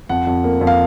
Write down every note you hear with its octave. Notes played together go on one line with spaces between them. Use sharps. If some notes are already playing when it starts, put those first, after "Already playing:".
F2 F#5
F2
A#3
F2
F5